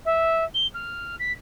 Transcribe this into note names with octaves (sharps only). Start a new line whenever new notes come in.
E5
G7
F6
B6